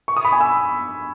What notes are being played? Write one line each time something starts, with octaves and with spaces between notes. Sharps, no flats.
C#6
D#6
B5
G#5
E6